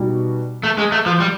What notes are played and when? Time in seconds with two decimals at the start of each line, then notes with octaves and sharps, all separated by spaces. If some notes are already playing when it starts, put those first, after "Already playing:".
Already playing: B2 G3 B3 D#4 F#4
0.63 A3
0.78 G#3
0.92 A3
1.06 F3
1.20 G3